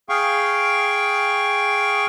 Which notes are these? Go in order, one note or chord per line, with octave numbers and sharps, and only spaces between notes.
G#4 F5 G5 C#6